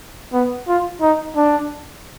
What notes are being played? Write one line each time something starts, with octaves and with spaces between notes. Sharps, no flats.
B3
F4
D#4
D4